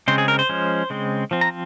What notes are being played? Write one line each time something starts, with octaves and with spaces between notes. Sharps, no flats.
C#3 G#3 C4 C5
G#4
A#4
C5
F3 G#3 C#4
C#3 G#3 C4
F3 C4
A#5